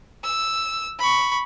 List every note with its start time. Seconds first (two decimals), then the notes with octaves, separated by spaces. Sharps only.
0.24 E6
0.99 B5 C#6